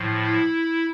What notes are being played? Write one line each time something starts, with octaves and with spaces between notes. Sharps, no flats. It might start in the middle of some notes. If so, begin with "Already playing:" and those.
Already playing: A2 F3
E4